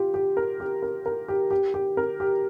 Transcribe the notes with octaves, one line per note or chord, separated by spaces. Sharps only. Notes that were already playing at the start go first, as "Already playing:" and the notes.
Already playing: F4 G4
G4
A#4
G4
A#4
A#4
G4
G4
G4
A#4
G4